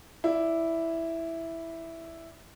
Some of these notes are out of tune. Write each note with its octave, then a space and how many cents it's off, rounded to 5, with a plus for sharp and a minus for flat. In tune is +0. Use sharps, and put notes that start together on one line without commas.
E4 +0 D5 +0